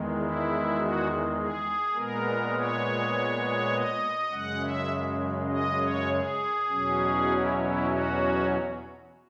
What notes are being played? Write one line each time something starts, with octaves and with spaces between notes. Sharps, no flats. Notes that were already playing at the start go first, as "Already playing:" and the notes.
Already playing: E2 D#3 G#3
E4
F#4
G#4
A#2 G#3 B3 A#4
C#5
D#5
F#2 C#3 G#3 F#5
E5
D#5
C#5
G#4
E2 B2 F#3 C#4
E4
E4
F#4